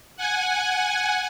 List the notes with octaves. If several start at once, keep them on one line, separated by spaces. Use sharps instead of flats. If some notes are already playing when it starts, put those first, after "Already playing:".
F#5 G#5